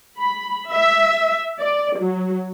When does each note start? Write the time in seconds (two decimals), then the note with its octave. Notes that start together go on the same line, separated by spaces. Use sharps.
0.17 B5
0.72 E5
1.60 D5
1.99 F#3